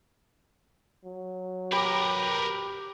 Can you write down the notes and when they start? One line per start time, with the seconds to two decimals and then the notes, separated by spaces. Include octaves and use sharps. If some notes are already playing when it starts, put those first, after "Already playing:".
1.05 F#3
1.72 G4 A#4 B4 B5 D6